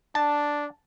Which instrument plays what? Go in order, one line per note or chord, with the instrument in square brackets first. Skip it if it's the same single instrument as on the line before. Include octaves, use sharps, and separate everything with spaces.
[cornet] D4 [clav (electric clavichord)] A5